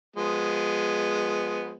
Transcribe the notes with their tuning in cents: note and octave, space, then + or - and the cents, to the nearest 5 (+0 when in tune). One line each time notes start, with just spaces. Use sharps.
F3 +25 G#3 +0 B3 +0